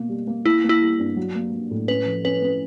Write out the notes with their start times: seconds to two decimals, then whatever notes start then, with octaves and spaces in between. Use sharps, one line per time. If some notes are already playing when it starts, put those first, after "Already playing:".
Already playing: B2 A#3
0.09 G3
0.27 A#3
0.46 A#3 E4
0.64 A#3
0.69 E4
0.81 G3
0.99 G2
1.17 F#3
1.35 A#3
1.53 F#3
1.71 A2
1.88 C#4 B4
2.06 F3
2.25 C#4 B4
2.42 C#4